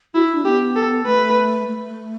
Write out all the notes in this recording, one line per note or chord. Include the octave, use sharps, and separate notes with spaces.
E4 F#4
E4
D4
B3 G4
A4
A3 B4
A3